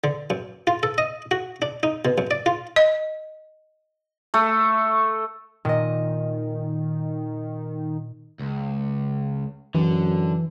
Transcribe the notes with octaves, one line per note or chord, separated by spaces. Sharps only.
D3
F#2
F4
A4
D#5
F#4
D4
D#4
B2
F#2
D5
F4
D#5
A3
A#2 D#3 D#5
C#2
F#2 D3 E3